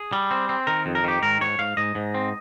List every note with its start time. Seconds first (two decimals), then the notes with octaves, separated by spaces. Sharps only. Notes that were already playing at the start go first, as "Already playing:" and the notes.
Already playing: G#4
0.13 G3
0.31 C4
0.49 C4
0.67 D#3 A#4
0.86 F2
0.95 A#4
1.04 D#3 G4
1.22 G#2 A#4
1.41 G#2 C#5
1.59 G#2 F5
1.77 G#2 D#5
1.95 G#2
2.14 C4